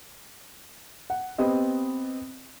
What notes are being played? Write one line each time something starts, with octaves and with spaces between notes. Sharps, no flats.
F#5
B3 C4 G4 D#5